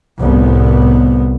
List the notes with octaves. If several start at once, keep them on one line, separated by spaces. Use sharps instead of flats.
C2 A2 B3